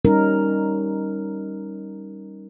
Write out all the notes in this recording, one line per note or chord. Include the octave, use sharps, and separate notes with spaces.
G3 C#4 D#4 A#4